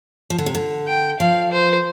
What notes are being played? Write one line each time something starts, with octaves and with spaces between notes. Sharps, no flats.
F3
D3
C3
D3
G5
F3 F5
C5